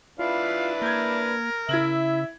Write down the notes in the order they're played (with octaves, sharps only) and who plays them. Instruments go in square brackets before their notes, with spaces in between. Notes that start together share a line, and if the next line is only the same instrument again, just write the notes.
[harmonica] D4 E4 B4 [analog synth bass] F4 [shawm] F5
[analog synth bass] A#3 [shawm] A#4 [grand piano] G6 G#6
[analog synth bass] C#3 [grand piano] E4 G#6 F#7 [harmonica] E5